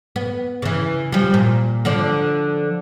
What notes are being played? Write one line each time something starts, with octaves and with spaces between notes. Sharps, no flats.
B3
C#3 E3
F3 G3
A#2
D3 F3 D5